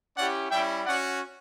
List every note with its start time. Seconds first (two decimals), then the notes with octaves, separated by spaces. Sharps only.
0.15 C#4 E4 G4 D5 F#5
0.50 G3 C#4 E4 E5 G5
0.84 C#4 F#4 D5 F#5